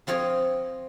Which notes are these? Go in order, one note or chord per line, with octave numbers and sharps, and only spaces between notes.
F3 C4 F4 C#5 D#5